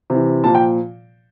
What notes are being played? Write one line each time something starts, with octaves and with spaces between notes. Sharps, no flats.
C3 E3
A#2 F3 A5
G5